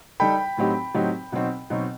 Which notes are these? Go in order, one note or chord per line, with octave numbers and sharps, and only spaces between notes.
G3 D#4 A4 G5 B5
A2 F#3 C4 D#4 G4
A2 F#3 C4 D#4 G4
B2 F#3 C4 D#4
B2 F#3 C4 D#4